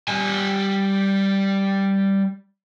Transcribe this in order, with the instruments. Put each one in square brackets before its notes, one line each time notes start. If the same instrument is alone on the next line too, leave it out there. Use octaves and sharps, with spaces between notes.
[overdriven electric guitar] G3 G#5